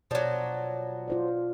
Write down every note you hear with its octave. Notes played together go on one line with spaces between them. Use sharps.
B2 F3 F#3 D5
F4 C5 D5